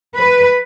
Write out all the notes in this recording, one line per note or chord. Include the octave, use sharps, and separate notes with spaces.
B4